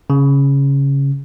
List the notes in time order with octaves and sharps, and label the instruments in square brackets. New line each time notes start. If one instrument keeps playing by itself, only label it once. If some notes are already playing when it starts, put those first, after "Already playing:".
[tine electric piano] C#3